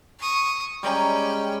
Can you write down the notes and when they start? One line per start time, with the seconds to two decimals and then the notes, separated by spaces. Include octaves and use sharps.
0.19 C#6 D#6
0.83 G3 G#3 C#4 G5 A#5